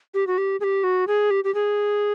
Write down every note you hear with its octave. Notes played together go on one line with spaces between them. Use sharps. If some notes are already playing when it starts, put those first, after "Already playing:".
G4
F#4
G4
G#4
G4
F#4
G#4
G4
G4
G#4